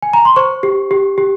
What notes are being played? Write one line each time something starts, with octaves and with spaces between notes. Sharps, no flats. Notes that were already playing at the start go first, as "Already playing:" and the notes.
G#5
A#5
C6
C5 C#6
G4
G4
G4